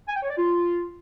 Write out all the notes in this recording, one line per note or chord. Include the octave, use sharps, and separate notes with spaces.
G#5
G5
C#5
D5
F4